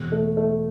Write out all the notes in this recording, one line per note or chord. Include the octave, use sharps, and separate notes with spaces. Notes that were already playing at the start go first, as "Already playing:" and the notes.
Already playing: E1
A3
A3